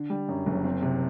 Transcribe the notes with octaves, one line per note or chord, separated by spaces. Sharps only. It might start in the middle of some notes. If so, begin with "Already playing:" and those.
Already playing: D3
G3
F#2
F#1
C4
C3